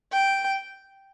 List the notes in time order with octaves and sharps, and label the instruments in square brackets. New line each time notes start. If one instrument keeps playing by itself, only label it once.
[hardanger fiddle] G5